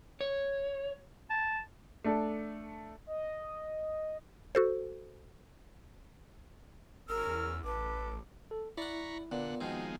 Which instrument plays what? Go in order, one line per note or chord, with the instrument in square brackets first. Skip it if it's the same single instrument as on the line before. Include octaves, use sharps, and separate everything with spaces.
[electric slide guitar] C#5
[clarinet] A5
[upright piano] A3 D4 A4
[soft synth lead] D#5
[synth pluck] F#4 A4 C5
[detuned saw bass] G#1 [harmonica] C#4 E6 F6 [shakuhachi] A#4
[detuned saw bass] E2
[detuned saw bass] A1 [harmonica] A4 D6 [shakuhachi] B4
[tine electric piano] A4
[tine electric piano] E4 [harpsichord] D5 F#5 [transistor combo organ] A#5 B5 C#6
[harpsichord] A#2 [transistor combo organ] D3 F#5 [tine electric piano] B3
[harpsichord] B2 C4 [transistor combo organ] D#3 F3 G#3